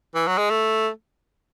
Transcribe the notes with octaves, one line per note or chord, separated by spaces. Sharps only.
E3
F#3
G#3
A3